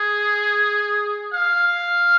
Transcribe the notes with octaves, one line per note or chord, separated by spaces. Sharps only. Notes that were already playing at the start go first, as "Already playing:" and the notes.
Already playing: G#4
F5